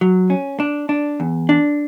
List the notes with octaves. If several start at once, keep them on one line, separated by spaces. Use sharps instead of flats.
F#3
C#4
D4
D4
E2
D4